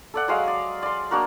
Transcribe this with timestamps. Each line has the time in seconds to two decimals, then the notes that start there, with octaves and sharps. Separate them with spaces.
0.14 A4 D5 F#5
0.28 F#3 G#3 F5
0.48 D5
0.83 D5 C6
1.11 A#3 D4 F#4 A#4